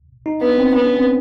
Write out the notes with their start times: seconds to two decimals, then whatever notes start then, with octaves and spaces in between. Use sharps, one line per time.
0.26 D#4
0.41 B3 D4
0.58 C4
0.74 B3 C#4
0.86 D4
0.97 C4